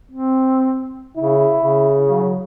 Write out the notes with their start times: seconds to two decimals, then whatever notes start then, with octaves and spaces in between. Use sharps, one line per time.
0.11 C4
1.17 C#3 E4
1.55 C#3
2.10 F#3